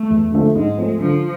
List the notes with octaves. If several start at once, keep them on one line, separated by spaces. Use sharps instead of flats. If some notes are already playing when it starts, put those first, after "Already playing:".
Already playing: A3
E2
D3 F3 A3 C4
G#2 G#3
F3 A3 C4
D3 F3